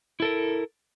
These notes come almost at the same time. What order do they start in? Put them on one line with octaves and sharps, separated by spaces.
E4 A4 A#4